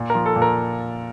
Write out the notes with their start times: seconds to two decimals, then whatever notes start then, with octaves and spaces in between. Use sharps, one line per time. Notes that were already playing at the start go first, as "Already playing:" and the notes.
Already playing: A#2
0.10 A#4
0.15 F3
0.26 A4
0.36 A#2
0.42 A#4